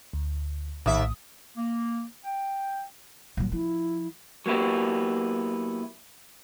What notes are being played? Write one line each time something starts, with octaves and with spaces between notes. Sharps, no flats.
D2
A#1 D#2 A2 E5 D#6
A#3
G5
A#2 F#3
F3 E4
F#3 A#3 B3 E4 G4